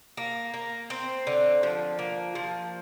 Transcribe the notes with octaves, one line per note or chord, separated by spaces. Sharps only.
A#3
A#3
C4
D3
F3
A#3
F3